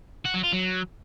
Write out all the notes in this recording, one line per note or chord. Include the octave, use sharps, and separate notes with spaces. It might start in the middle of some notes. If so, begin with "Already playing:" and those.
F#4
F#3
F4
F#3